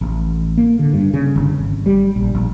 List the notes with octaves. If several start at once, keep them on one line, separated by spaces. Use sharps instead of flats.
A1
A#3
D3
G2
C#3
G1
G#1
G3
A#1
A#1